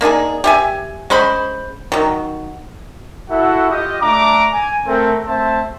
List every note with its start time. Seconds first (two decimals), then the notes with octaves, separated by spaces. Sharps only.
0.01 A#3 D4 D#4 G#4
0.44 G4 E5 G#5
1.10 G#3 C#4 C5 B5
1.92 D#3 F#3
3.30 E4 F#4 A4 E5 F#5
3.71 F4 G4 D#5
4.02 A3 D4 A#5 D6
4.53 G#5
4.87 A3 C4 A4 A#4
5.27 A3 C4 C5 E5 A5